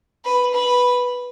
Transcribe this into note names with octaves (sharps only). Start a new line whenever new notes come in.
B4
B4